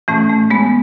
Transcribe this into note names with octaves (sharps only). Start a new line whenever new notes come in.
A2 E3 A3 C#4
A3
G#3 B3